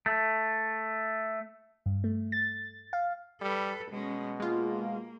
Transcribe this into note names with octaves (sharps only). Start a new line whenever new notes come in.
A3
G2
A3
A6
F5
G3 A4 B4
B2 G#3 C#4
G#3 A#3 F4